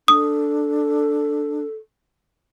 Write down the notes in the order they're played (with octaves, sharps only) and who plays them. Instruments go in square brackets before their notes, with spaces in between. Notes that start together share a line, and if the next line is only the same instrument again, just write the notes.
[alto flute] D4 [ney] A4 [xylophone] D#6